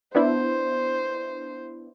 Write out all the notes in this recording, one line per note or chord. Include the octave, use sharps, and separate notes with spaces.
B3 D4 E4 C5